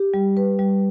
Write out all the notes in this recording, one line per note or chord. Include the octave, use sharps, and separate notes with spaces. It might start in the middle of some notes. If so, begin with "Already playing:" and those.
Already playing: G4
G3
B4
G3